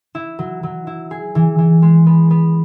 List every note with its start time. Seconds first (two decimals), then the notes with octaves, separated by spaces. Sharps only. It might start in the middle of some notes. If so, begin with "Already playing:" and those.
0.15 E4
0.39 F#3
0.63 F#3
0.87 E4
1.11 G#4
1.35 E3
1.58 E3
1.82 G#3
2.06 B3
2.31 B3